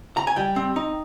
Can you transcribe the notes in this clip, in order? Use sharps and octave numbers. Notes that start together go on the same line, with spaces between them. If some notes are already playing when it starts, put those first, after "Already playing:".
A#5
G#5
G3 G5
C4
D#4